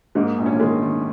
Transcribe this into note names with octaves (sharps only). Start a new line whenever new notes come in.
G#2 A#3 D#4
A#1
C#4
A#3
D#3 G#3
D#3